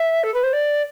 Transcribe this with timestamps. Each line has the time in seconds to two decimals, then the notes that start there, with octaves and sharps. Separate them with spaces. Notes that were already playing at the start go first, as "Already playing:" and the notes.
Already playing: E5
0.23 A4
0.34 B4
0.43 C5
0.53 D5